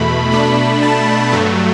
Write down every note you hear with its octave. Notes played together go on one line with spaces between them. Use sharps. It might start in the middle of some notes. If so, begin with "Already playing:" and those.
Already playing: E2 B2 A3 B5
B2 A3 D4 B5
A5
G2 F#3 A3